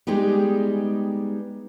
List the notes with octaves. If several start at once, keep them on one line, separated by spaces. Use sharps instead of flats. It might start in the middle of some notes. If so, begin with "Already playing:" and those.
G3 G#3 B3 D#4 G4 G#4